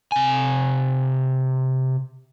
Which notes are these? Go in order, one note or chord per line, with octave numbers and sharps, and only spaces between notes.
C3 G#5